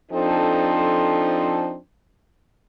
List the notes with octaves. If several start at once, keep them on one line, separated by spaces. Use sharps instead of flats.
F3 C4 D4 D#4 A4